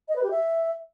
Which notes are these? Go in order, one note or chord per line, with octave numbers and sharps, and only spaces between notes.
D#5
B4
G4
E5